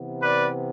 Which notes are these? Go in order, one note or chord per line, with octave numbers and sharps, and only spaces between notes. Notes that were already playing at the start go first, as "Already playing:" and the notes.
Already playing: C3 E3 B3
B4 D5